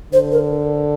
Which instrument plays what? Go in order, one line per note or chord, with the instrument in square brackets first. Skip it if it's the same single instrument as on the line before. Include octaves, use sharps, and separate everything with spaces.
[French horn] D3 [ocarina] C5
[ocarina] A#4